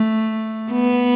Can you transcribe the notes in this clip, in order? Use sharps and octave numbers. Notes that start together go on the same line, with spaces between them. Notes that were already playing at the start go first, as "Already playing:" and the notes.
Already playing: A3
B3